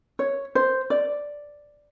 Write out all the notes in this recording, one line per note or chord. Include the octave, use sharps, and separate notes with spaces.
C#5
C5
D5